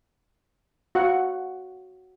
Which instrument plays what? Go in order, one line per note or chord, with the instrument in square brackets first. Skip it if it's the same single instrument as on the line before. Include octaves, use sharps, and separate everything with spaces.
[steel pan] F#4 F5 F#5